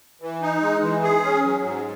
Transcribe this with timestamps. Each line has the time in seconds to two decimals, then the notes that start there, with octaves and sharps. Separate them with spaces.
0.22 E3
0.42 D#4
0.62 G#3
0.83 E3
1.03 G#4
1.23 C#4
1.44 F#3
1.64 G#2